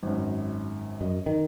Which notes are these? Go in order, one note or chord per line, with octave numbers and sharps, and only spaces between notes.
G#1 F#2
F#2 D#5
D#3